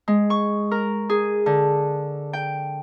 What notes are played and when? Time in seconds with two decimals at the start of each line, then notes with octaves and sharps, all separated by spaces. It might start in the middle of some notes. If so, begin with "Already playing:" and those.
0.08 G#3
0.30 C#6
0.71 A#4
1.10 G#4
1.46 D3
2.33 G5